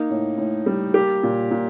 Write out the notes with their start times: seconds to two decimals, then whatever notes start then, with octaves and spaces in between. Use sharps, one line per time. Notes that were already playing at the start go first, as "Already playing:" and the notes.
Already playing: A#3 D#4
0.10 A2
0.38 A2
0.66 G3
0.94 A#3 G4
1.23 A#2
1.51 A#2